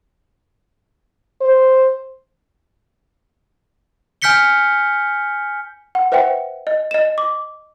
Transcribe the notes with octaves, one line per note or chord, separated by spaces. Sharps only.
C5
G#5 F6 G6 B6 C#7 G7
F#5
B4 C5 E5 F#5 G5
D#5
D#5 E7
D6